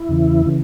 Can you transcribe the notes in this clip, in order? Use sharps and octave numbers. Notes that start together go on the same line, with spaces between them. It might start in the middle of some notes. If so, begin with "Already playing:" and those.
Already playing: E4
E2 C#3 E3
C#3 E3